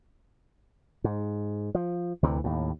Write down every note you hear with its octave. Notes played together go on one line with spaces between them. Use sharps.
G#2
F3
D2 C3 E3
D#2 A2